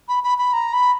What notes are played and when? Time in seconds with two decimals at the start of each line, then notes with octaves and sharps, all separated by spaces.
0.09 B5
0.23 B5
0.38 B5
0.53 A#5
0.73 B5